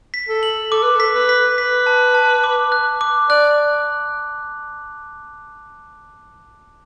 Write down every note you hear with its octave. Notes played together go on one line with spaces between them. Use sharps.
B6
A4
F#7
A4 D6
B4
A4 B6
B4
B6
B4 B6
A5
A5
D6
F#6
D6
D5 F#6